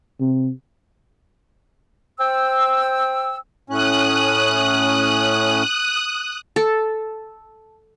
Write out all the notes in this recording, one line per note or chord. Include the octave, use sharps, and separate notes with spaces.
C3
C5 G5 E6
A2 C#4 D#6 F#6
A4